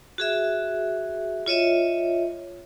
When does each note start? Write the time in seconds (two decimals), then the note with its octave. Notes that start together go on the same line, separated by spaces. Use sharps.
0.18 F#4 G#4 E5
1.46 F4 C#5 D#5 E5